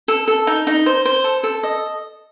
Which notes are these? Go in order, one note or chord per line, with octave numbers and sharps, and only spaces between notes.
A4
A4
D#4
D#4
C5
C5
A4
A4
D#5